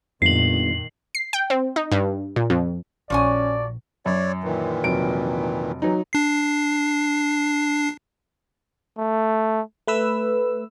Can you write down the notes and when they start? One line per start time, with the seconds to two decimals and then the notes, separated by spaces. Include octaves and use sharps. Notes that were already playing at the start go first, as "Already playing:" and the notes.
0.22 G1 F2 A#2 D#3 C7 F#7
1.15 C7
1.33 G5
1.50 C4
1.76 D#4
1.92 G2
2.36 A#2
2.50 F2
3.10 A#1 F3 C#4 F#4 D5 G#5
4.06 F#2 C#5 D5
4.44 A#2 D#3 E3
4.84 F1 F#3 D7
5.82 E3 F#3 D#4
6.13 D4 C7
8.98 A3
9.87 A3 B4 E6